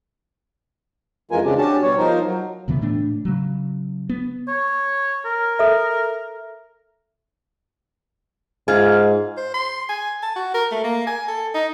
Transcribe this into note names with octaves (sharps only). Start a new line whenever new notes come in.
F2 E3 G#3 F4 A#4 G#5
C#3 G#3 C4 D4 G4
C#4 D4 F#4 G4 A5
B2 G3 C#5
F3 D#4 A#4 C5
F#3
D2 C#3 E3 B3
A2 A3 D4
C#3 F#3
B3
C#5
A#4
A4 E5
G#2 F4 G#4
C5
C6
G#5
A5
F#4
A#4
A3
A#3
G#5
A4
D#4